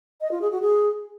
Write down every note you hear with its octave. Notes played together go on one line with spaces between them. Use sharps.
D#5
F4
G#4
F#4
G#4